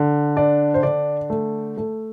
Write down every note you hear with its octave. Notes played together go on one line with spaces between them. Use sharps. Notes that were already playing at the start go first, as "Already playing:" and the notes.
Already playing: D3
D4 D5
C5
D3 D5
A3
A3